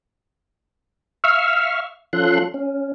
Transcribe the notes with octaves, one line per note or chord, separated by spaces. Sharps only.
E5 F5 C#6 E6 F6
F3 C#4 F4 A4 C6 F#6
C#4